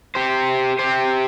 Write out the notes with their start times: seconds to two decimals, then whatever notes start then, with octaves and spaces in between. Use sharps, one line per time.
0.15 G4 C5
0.79 G4 C5